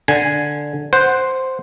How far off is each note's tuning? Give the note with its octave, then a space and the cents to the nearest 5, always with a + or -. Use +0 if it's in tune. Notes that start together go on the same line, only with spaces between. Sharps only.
D3 +0 G#5 +0
C5 +0 F#5 +0